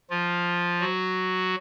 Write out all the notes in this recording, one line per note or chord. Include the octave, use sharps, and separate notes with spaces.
F3 F4
F#3 F#4